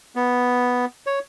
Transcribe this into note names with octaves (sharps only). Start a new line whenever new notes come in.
B3
C#5